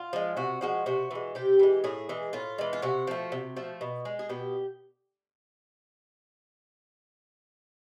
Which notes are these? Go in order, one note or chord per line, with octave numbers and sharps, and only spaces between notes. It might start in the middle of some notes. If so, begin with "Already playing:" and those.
Already playing: F4
F3 G#3
C3 F#4
F3 G#3 F#4
C3 F#4
E3 G#3
C3 G4
E3 G#3
A2 G#4
E3 G#3
A2 F4
E3 G#3
F4
C3 F#4
F3 A3
C3
F3 A3
B2
G#3
G#4
B2 G4